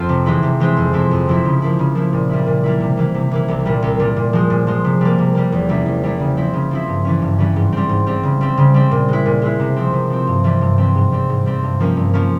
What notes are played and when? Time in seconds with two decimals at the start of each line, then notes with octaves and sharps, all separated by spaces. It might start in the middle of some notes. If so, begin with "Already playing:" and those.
Already playing: F2 F3 C4 F4
0.09 C3
0.26 E3 G#3 C4 E4
0.43 C3
0.60 E3 G#3 C4 E4
0.77 F2
0.93 C3 F3 C4 E4
1.11 F2
1.28 C3 F3 C4 E4
1.45 C#3
1.62 F3 A#3 E4
1.79 C#3
1.95 F3 A#3 E4
2.13 A#2
2.29 G3 A#3 E4
2.46 A#2
2.64 G3 A#3 E4
2.81 C3
2.97 E3 A#3 E4
3.14 C3
3.31 E3 A#3 E4
3.48 C2
3.65 A#2 G3
3.82 C2
3.99 A#2 G3
4.16 A#2
4.33 F3 G#3
4.50 A#2
4.67 F3 G#3
4.84 C3
5.01 G3 A#3
5.18 C3
5.35 G3 A#3
5.52 E2
5.69 C3 G3 C#4 E4
5.86 E2
6.03 C3 G3 C#4 E4
6.20 C#3
6.37 F3 C4 E4
6.53 C#3
6.71 F3 C4 E4
6.88 G2
7.05 E3 G3 C#4
7.22 G2
7.38 E3 G3 C#4
7.56 G#2
7.72 G3 C4
7.89 G#2
8.07 G3 C4
8.23 C#3
8.41 G3 C4
8.57 C#3
8.74 G3 C4
8.91 A#2
9.08 G#3 E4
9.26 A#2
9.42 G#3 E4
9.60 C3
9.76 F3 C4
9.93 C3
10.10 F3 C4
10.27 G2
10.44 E3 G3 C4
10.61 G2
10.78 E3 G3 C4
10.95 G#2
11.12 G3 C4
11.29 G#2
11.46 G3 C4
11.63 G2
11.80 F3 A#3 C#4
11.97 G2
12.14 F3 A#3 C#4